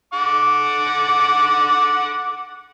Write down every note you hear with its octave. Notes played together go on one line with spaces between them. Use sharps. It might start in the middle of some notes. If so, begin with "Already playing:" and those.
F#5 D6